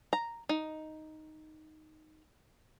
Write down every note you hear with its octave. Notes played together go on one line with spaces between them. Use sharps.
A#5
D#4